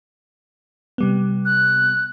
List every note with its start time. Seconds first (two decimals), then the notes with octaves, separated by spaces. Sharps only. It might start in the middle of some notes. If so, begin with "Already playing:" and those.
0.98 C3 G3 B3
1.45 F#6